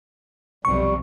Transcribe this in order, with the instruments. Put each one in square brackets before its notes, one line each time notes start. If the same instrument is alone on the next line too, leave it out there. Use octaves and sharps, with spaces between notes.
[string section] B1 F2 C3 [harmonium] G3 [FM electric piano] C#6